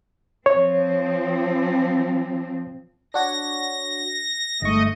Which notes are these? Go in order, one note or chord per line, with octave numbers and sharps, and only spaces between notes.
F3 C4 C#5
D4 F#4 C#5 A#6
G1 G#2 A3 D#5 C#6